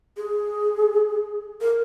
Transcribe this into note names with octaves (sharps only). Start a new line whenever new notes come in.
G#4
A#4